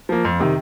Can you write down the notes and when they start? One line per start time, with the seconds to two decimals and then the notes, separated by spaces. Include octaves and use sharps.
0.09 F3 A#3
0.25 F2
0.40 C3 D#3